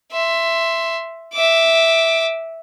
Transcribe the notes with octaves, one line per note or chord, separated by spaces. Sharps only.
E5 C6
E5 D6